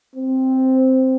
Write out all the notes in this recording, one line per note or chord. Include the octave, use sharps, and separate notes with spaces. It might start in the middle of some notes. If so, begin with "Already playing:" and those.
C4